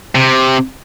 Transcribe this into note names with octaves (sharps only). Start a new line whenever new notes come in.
C3